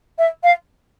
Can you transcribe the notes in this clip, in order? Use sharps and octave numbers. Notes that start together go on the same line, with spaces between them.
E5
F5